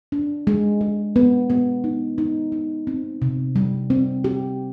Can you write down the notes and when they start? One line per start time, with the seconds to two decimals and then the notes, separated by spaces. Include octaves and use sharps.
0.12 D4
0.47 G#3
0.81 G#3
1.16 B3
1.50 B3
1.84 D#4
2.18 D#4
2.52 D#4
2.87 C4
3.22 C3
3.56 G3
3.90 C4
4.24 G4